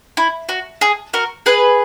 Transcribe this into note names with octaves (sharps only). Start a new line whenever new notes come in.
E4
F#4
G#4
F#4 A#4
G#4 B4